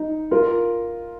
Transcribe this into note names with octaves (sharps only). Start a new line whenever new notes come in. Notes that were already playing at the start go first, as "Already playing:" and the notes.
Already playing: D#4
F4 A#4